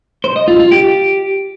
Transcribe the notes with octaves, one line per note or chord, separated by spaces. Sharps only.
C5
D#5
F4
F4
G4